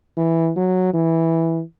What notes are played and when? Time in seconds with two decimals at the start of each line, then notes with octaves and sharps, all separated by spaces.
0.17 E3
0.56 F#3
0.93 E3